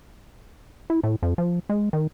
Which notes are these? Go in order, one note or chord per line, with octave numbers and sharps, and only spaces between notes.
E4
A2
F2
F3
G#3
D#3